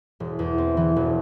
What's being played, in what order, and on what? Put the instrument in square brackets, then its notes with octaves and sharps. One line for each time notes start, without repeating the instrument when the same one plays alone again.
[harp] E1
E2
C4
E3
E1